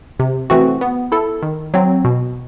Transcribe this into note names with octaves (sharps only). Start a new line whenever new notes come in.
C3
E3 A3 C4 F#4
B3
E4 A4
D#3
F#3 C4
B2